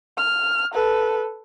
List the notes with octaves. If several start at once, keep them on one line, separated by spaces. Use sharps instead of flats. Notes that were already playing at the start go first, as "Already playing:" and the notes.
F6
A4 B4